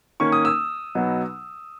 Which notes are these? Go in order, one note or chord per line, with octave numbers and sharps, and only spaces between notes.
D#3 A#3 C#4 C#6
D#6
E6
B2 F#3 B3 D#4